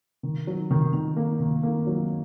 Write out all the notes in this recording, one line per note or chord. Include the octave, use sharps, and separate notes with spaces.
D#3
F#3
D#3
D#3
A#3
D#3
A#3
F#3